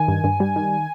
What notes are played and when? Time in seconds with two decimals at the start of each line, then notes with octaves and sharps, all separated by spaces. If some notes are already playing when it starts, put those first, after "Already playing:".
Already playing: D#3 G#5
0.08 G2
0.24 G2
0.40 G3
0.56 D#3